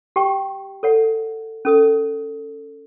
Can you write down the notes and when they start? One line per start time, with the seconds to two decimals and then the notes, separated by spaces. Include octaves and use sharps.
0.16 G4 G5 C#6
0.83 A4 C#5 F#5
1.65 C#4 A4 D#6